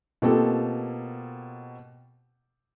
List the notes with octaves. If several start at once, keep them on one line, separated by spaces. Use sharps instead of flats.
B2 A#3 C4 F4 G4 A4